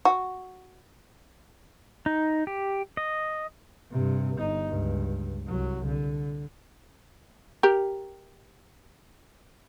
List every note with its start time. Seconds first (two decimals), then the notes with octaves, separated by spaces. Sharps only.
0.05 F#4
2.06 D#4
2.47 G4
2.97 D#5
3.91 G2 C3
4.37 G1 D#4
4.68 C#2 G2
5.48 C2 F#3
5.86 D3
7.63 G4 A#4